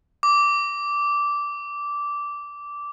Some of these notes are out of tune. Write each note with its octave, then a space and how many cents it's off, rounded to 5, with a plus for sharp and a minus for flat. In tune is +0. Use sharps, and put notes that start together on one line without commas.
D6 -10